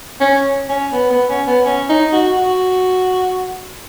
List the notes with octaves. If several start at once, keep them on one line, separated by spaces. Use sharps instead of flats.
C#4
C#4
B3
B3
C#4
B3
C#4
D#4
F#4
F#4